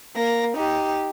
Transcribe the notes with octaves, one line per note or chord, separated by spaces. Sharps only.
A#3 A#6
D#4 G4